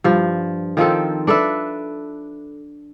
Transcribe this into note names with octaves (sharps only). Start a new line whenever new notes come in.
G2 F3
D#3 F3 C4 A4
D4 A4 B4 E5